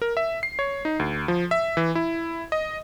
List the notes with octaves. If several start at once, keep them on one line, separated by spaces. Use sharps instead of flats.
A#4
E5
C7
C#5
D#4
D2
F3
E5
E3
E4
D#5